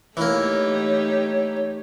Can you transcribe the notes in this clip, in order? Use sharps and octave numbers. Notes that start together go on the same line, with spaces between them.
E3 A3 A#3 D#4 G4 C#5